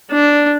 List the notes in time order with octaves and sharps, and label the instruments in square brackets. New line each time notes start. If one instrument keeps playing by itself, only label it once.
[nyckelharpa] D4